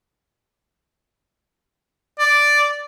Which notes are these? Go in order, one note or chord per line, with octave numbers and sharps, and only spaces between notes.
D5